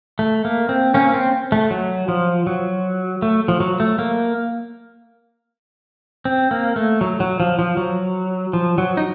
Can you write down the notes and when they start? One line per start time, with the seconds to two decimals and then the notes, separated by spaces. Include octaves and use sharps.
0.19 A3
0.45 A#3
0.69 C4
0.94 A#3 C#4
1.14 C4
1.52 A3
1.71 F#3
2.08 F3
2.47 F#3
3.22 A3
3.48 F3
3.60 F#3
3.80 A3
3.99 A#3
6.25 C4
6.51 A#3
6.76 A3
7.01 F#3
7.20 F#3
7.40 F3
7.59 F3
7.77 F#3
8.53 F3
8.78 F#3
8.97 D#4